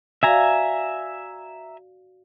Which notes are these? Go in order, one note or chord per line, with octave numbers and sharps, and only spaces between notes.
F#4 D5 E5 F5 G#5 A#5